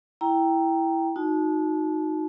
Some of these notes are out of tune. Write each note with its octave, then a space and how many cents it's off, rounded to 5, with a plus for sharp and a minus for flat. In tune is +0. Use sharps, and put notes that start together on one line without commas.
E4 +0 G5 +0 A#5 +0
D#4 +0 F#4 -30 A5 -30